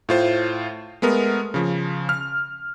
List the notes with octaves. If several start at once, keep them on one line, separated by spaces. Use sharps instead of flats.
A2 F4 C5
G#3 A3 B3 A#4
C#3 F3
F6